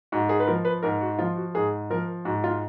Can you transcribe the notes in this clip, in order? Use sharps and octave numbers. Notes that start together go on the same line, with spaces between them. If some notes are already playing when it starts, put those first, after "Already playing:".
G#2 F#4
G#4
B4
F3 A#4
B4
G#2 A#4
F#4
F3 F4
F#4
G#2 G#4
F3 A#4
G#2 F#4
F4